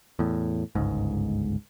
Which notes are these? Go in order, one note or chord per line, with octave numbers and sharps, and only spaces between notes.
E2 A2
G1 C#2 G#2